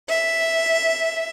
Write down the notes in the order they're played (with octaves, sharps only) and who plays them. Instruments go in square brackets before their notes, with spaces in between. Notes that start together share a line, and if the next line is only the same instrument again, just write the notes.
[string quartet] E5